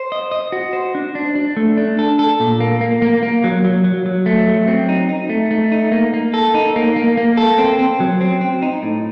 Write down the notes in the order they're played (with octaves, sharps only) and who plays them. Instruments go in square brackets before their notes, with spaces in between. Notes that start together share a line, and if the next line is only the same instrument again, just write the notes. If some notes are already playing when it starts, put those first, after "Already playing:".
Already playing: [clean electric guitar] C5
D#5
D#5
F#4
C5
D4
D4
D4
A3
D4
A4
A4
A#2
A#3
A#3
A#3
A#3
F#3
F#3
F#3
F#3
A3
F#3
C4
D#4
D#4
A3
A3
D#4
A#3
A#3
A4
D#4
A#3
A#3
A#3
A4
C4
C4
F#3
C4
C4
D#4
A2